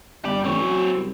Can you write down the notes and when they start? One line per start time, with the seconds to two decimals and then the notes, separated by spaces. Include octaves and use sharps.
0.25 G1 G4 D5
0.44 A1 C4 C#5
0.62 F#3
0.95 C2